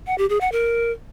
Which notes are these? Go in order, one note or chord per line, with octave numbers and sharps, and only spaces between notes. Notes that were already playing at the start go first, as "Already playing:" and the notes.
F#5
G4
G#4
F#5
A#4